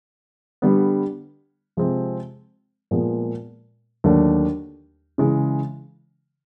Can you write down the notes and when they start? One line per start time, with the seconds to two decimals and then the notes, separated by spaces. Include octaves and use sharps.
0.62 D3 G3 B3
1.77 C3 F3 G#3 C4
2.91 A#2 F3 G#3 B3
4.04 D#2 D3 F#3 A3 D4
5.18 C#3 E3 G#3